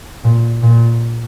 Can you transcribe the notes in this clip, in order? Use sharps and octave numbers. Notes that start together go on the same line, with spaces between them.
A#2
A#2